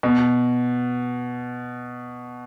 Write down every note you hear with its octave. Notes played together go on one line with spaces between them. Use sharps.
B2